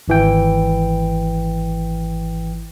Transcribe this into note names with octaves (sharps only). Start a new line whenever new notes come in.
G#1 E3 G5